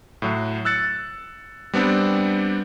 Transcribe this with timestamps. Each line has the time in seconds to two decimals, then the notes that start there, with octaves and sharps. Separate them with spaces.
0.22 A2 F#3
0.65 E6 F#6 A6 C#7
1.73 G3 B3 C4 D4